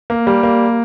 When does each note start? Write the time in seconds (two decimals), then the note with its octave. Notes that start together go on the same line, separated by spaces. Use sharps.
0.10 A#3
0.27 G3
0.43 A#3